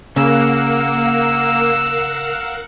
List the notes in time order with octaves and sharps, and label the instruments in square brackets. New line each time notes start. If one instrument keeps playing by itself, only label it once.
[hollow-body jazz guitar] C#3 [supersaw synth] A#3 [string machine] A#4 F5 F#5 [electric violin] E6